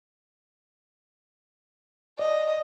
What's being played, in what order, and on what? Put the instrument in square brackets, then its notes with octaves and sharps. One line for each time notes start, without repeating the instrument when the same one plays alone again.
[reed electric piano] D5 [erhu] D#5